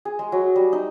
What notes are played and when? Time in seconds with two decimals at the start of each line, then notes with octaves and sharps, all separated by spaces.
0.05 G#4
0.19 G#3
0.32 F#3
0.56 G3
0.73 D#4